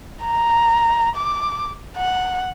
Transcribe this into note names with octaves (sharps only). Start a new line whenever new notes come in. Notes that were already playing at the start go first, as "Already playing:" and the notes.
A#5
D6
F#5